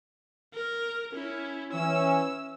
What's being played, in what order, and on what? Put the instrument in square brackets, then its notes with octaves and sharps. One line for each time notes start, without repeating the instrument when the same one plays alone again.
[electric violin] A#4
C#4 E4
[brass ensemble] E3 C#4 [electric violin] E6